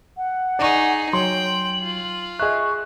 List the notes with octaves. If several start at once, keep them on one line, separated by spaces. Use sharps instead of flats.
F#5
D#4 G#4 D5 C#6
F#3 C#5 G5 C6 F#7
F4
G#4 D#5 E5 C#6 F#6